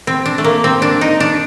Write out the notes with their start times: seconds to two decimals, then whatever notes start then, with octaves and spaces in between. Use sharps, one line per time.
0.07 C4
0.26 D4
0.38 A3
0.44 A#3
0.64 C4
0.82 D4
1.01 D#4
1.20 D4